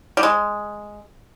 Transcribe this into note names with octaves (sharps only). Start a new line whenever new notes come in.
G3
G#3